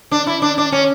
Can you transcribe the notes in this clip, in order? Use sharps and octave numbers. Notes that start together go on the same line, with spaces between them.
D4
E4
D4
D4
C#4